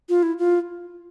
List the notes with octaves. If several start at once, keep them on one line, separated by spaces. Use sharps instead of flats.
F4
E4
F4